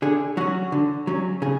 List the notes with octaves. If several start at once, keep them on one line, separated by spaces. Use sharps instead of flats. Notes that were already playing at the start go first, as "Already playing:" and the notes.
D3 G#4
F#3 C#4 F#4
D3
F#3 C#4
C#3 G#4